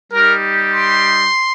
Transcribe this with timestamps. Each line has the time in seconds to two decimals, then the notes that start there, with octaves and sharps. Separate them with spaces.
0.12 G3 D#4 G4 A#4
0.71 C6